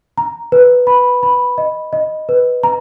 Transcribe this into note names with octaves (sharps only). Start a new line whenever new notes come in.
A#5
B4
B5
B5
D#5
D#5
B4
A#5